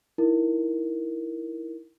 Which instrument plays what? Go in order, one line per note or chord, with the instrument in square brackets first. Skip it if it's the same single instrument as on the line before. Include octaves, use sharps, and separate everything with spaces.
[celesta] D#4 E4 A#4